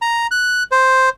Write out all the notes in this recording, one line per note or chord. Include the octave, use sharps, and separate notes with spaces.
A#5
F#6
C5